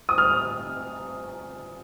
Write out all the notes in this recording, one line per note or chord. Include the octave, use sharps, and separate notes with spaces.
D#6
F6